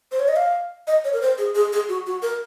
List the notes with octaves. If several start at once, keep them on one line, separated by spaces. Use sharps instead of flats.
C5
C#5
D#5
F5
D#5
C#5
A#4
C5
G#4
G#4
G#4
F#4
F#4
A#4